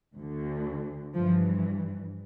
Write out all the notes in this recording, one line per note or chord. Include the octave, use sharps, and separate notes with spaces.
D2 D3
G2 E3 F3